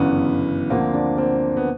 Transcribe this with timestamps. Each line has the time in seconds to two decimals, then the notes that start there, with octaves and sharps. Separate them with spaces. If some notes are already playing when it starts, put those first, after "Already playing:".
Already playing: G1 F#2 C#3 E3 B3
0.70 D2 D3 F3 A#3 C4
0.94 C4 D4
1.18 A#3 C4
1.57 B3